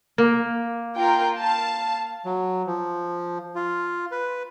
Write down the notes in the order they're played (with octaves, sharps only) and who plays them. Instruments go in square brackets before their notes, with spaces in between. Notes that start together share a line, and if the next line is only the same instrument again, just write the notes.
[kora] A#3
[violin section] F4 A#4 G5
F5 A5
[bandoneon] F#3
F3
F4
B4